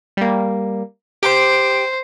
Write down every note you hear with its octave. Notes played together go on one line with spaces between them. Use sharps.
G3 A#3
G4 C5 D7